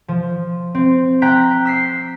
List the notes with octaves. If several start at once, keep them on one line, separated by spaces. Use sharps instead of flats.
F3
C4
G5 A#5 F#6 G6 B6
E6 B6 C7